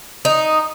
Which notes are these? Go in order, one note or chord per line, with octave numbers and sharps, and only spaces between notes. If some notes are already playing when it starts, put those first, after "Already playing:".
D#4